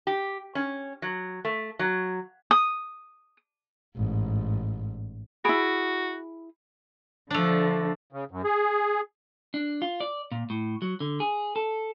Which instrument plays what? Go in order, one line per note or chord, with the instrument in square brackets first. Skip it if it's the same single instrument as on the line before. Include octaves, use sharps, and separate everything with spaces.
[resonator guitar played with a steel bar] G4
C#4
F#3
A3
F#3
[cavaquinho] D#6
[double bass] A1 G#2
[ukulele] E4 G#4 [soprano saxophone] F#4 [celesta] B5 D7
[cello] D3 F3 [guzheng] A3 D4
[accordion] C#3
F#2
G#4
[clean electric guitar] D4
F4
D5
A#2
A2
F#3
D3
G#4
A4